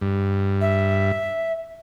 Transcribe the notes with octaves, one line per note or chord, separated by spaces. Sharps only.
G2
E5